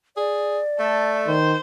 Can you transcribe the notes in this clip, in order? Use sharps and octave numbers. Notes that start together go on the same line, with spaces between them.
G#4 D5
A3 A4
D#3 C5